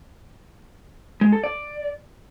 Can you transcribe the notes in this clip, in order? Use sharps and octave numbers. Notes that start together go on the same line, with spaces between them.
G#3
A4
D5